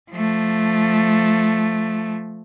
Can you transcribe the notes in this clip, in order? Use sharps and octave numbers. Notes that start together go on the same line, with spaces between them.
F3 A3